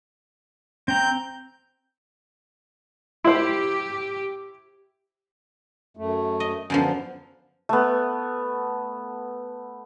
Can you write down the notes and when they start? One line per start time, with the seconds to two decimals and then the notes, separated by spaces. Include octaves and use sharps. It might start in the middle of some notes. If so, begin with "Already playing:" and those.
0.88 C4 G5 A#5 G6
3.25 E4 G4 C5
5.97 F#2 A3
6.40 D#5
6.70 F#2 D3 F3 B3
7.69 A3 B3